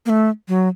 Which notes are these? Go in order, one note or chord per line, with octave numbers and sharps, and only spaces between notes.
A#3
A3
F#3